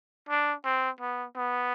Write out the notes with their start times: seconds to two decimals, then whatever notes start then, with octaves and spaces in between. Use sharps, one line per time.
0.29 D4
0.65 C4
1.01 B3
1.36 B3